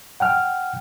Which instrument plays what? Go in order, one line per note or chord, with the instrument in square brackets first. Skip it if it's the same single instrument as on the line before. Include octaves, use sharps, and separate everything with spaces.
[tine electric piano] F#5 G5 F6